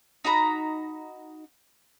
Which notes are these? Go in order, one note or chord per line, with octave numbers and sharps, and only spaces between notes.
D#4 F#4 A#5 B5